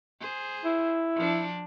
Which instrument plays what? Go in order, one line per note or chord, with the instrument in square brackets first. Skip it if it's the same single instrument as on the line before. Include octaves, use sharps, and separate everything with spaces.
[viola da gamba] G#4 C5
[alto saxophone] E4
[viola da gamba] F3 D4